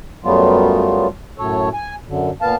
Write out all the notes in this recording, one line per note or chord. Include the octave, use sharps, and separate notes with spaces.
F#2 F#3 G3 A3 B3 F4
F#2 A2 A4 C#5
G#5
F#2 D3
A#2 B3 F5 A5